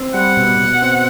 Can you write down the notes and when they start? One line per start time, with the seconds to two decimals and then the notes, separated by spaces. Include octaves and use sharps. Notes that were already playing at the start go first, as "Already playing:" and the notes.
Already playing: C4
0.14 G3 F#5
0.37 B2
0.60 B2
0.82 C4